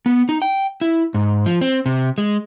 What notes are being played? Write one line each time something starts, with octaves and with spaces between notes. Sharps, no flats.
B3
D#4
G5
E4
G#2
F3
C4
C3
G#3